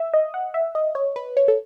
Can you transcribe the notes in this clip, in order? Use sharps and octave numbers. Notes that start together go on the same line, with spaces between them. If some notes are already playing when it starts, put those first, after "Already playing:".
Already playing: E5
D#5
F#5
E5
D#5
C#5
B4
C#5
A4